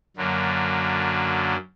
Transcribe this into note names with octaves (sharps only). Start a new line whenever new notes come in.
F#2 D3 F#3 A#3